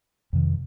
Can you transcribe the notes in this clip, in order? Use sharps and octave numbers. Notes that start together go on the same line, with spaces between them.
F2 C3 D#3